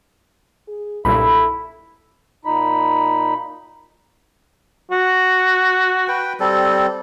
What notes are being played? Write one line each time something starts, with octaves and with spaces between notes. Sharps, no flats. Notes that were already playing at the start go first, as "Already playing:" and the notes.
G#4
B1 G2 A#2 E4 A4 B5
A#2 D#4 B5
F#4
B4 G5
G3 C4 A4